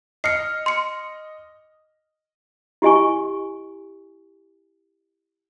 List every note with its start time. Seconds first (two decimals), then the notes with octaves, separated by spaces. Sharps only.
0.24 D#5 F6 C7 C#7
0.66 C6 C#7
2.82 E4 G4 D#5 G#5 C#6